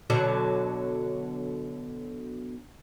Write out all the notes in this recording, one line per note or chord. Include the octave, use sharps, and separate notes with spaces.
B2 D3 F#3